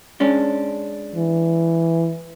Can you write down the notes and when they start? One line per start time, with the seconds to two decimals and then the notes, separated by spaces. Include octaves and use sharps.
0.20 G#3 C#4 D4
1.15 E3